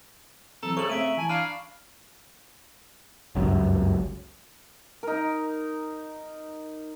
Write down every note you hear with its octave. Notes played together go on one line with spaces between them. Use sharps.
E3 F#3 C4 A4 A#5
C#3 A4 C5 C#5 C#6 F#7
A3 C4 E5 D7 D#7
E3 G#5 A5 G#6
D4 F5 B5 F6
G1 C#2 F#2
D#4 A#4